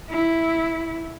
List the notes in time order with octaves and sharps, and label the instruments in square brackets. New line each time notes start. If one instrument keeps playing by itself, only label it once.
[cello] E4